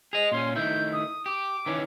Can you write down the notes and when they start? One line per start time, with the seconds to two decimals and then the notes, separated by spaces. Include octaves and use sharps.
0.13 G#4 D#5 F7
0.32 A#2 C#4 C6
0.56 D#3 A3 E4 G6
0.93 D#6
1.26 G4 D6
1.66 D#3 E3 C#4